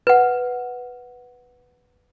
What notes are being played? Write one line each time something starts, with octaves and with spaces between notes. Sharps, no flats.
B4 F#5